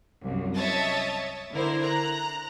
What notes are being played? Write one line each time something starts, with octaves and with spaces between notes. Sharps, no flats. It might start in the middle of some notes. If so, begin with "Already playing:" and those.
C2 F#2
C#5 D#5 E5 A5 D#6 A6
D3 E4 A#4 C5
A#5 F#6